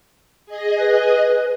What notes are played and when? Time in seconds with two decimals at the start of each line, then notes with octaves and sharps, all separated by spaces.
0.46 G#4 D#5
0.80 B4